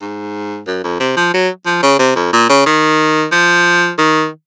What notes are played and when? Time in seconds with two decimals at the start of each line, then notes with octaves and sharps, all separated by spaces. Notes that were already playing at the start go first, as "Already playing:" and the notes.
0.01 G#2
0.67 F#2
0.84 F2
1.00 C3
1.17 F3
1.34 F#3
1.66 F3
1.82 C#3
1.99 C3
2.16 F2
2.33 A#2
2.49 C#3
2.66 D#3
3.32 F3
3.98 D#3